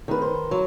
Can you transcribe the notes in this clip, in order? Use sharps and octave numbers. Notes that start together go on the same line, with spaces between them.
D#3 B4
C5
F#3